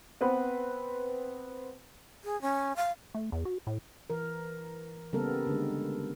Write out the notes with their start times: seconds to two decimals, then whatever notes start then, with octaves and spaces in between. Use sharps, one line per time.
0.21 B3 C4 B4
2.24 G#4
2.42 C#4
2.76 F5
3.15 A3
3.32 E2
3.45 F#4
3.67 A2
4.10 E3 A#4
5.13 C#3 G3 A#3 B3 A4 A#4
5.47 D3 G#3